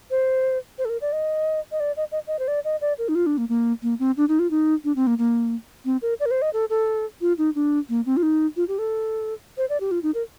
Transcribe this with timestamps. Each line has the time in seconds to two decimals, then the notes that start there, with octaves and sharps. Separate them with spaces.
0.11 C5
0.78 C5
0.85 A4
0.89 A#4
1.01 D5
1.12 D#5
1.72 D#5
1.80 D5
1.97 D#5
2.12 D#5
2.27 D#5
2.39 C5
2.48 D5
2.64 D#5
2.81 D5
2.98 A#4
3.09 D#4
3.15 F4
3.26 D4
3.38 A#3
3.49 A#3
3.83 A#3
3.99 C4
4.17 D4
4.28 D#4
4.39 F4
4.51 D#4
4.84 D4
4.96 C4
5.07 A#3
5.18 A#3
5.85 C4
6.02 A#4
6.20 D5
6.26 A#4
6.31 C5
6.42 D#5
6.53 A4
6.70 A4
7.21 F4
7.38 D#4
7.55 D4
7.89 A#3
8.06 C4
8.17 F4
8.23 D#4
8.56 F4
8.68 G4
8.79 A4
9.57 C5
9.69 D5
9.80 G4
9.91 F4
10.03 D#4
10.14 A#4